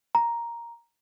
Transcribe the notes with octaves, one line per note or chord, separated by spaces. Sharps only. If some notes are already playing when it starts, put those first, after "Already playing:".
A#5